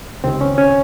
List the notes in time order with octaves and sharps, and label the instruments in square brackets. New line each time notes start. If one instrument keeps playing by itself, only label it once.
[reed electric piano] C#2 C3 D#3 C4
C#4
C#4